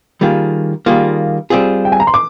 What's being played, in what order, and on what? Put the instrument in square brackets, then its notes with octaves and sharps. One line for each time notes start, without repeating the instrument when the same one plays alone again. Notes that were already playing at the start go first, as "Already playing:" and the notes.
[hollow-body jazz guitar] D#3 G3 A#3 F4 G#4
D#3 G3 A#3 F4 G#4
G3 C4 F4 G#4
[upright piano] G5
G#5
A#5
C6
D6